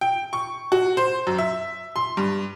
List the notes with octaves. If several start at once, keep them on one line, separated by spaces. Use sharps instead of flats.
G5
C#6
F#4
C5
F#2
E5
C6
G2